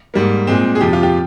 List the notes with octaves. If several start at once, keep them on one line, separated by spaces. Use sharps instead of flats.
G#2 G3 A#3
A#2 G#3 C4
G#4
F2 C3 F3 G4
F4
G4